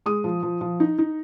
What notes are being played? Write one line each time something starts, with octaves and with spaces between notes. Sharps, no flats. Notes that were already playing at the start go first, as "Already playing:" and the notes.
G#3 D#6
F3
F3
F3
D#4
D#4